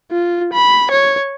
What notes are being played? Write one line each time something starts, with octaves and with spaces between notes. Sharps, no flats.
F4
B5
C#5